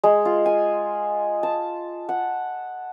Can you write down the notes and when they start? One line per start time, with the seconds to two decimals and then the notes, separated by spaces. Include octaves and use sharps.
0.04 G#3
0.25 F4
0.46 G#5
1.43 A5
2.09 F#5